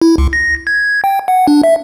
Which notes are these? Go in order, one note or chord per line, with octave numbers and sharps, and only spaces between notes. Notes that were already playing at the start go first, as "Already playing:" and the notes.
E4
C#2
A#6
G#6
G5
F#5
D4
E5